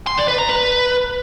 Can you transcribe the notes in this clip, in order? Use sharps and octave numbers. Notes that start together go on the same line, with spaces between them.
C6
D5
B4
A#5
B4